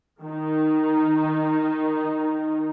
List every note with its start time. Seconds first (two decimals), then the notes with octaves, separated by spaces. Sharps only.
0.24 D#3 D#4